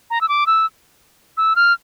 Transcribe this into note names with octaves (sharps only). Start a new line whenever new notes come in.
A#5
E6
D6
E6
E6
F6